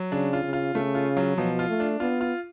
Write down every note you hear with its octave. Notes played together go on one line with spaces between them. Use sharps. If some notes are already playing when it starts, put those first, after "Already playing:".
Already playing: F#3
C#3 D4
F4
C#3
F4
C#3 A3
F4
F#3
B2 F3
F4
A3
D4
B3 F4
F4